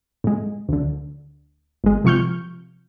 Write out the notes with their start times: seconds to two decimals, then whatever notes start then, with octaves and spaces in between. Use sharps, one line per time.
0.24 A2 G#3
0.69 D2 D3
1.84 G#1 G#3
2.04 C3 F3 C#6 F6 G6